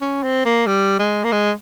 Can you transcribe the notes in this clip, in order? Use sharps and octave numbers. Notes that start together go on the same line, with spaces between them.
C#4
C4
A#3
G3
G#3
A#3
G#3